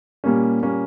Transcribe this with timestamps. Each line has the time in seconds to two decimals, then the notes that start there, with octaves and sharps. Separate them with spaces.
0.24 A#2 G3 A#3 C#4
0.62 A#2 G3 A#3 C#4